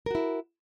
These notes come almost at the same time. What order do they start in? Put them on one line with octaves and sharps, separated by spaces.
A#4 F#4 E4